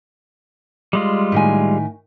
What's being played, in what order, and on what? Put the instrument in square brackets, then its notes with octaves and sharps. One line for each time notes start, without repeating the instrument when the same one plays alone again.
[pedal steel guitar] G3 G#3 F4
[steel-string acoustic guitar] A2 D#3 G#5